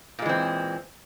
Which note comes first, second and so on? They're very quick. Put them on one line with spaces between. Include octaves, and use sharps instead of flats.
A#2 G#3 E3 C4